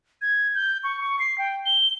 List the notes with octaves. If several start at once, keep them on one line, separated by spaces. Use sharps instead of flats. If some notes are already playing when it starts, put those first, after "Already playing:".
G#6
G6
C#6
C#6
C7
G5
G7